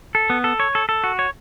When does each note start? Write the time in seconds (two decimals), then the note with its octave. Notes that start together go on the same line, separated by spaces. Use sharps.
0.15 A4
0.30 B3
0.44 A4
0.60 C#5
0.75 A4
0.89 A4
1.04 F#4
1.19 C#5